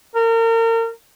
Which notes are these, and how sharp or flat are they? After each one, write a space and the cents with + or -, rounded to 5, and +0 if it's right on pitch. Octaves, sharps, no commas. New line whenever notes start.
A#4 -35